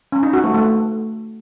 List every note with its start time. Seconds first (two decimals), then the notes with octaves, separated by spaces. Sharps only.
0.12 C#4
0.23 D#4
0.33 F#4
0.44 A3
0.54 A3